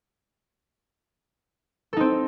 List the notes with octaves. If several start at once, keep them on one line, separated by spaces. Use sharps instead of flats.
C4 D#4 A4